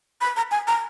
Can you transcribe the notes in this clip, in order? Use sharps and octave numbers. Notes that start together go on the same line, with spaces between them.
B5
A#5
G#5
A#5